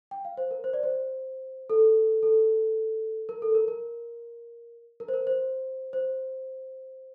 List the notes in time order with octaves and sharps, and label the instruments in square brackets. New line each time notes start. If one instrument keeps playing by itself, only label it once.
[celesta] G5
F5
C5
A#4
C5
D5
C5
A4
A4
A#4
A4
A#4
A#4
A#4
C5
A#4
C5
C5